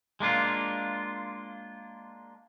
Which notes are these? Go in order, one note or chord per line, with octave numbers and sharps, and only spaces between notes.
G#3 A#3 D4 F4